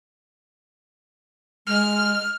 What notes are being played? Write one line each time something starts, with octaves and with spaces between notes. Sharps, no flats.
G#3 F6